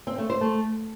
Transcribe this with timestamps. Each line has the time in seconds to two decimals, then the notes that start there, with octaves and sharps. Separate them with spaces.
0.07 C4
0.18 A3
0.30 C5
0.41 A3